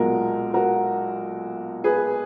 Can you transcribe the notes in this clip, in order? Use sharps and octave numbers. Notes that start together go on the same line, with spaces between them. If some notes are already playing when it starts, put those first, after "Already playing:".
Already playing: B1 A#2 G#3 F#4 A#4
F#4 A#4
G#4 B4